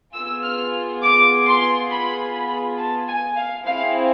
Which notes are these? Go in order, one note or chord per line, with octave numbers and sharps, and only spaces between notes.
B3 F4 G#4 E6
F6
D6
C6
B5
B5
A5
G#5
F5
C4 E4 G#4 F5